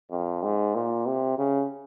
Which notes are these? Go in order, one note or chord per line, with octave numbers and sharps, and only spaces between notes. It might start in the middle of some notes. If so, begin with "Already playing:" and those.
F2
G#2
A#2
C3
C#3